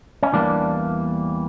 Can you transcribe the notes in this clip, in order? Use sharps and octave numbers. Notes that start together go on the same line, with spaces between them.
C#4
E2 E3 G3 A#3 D4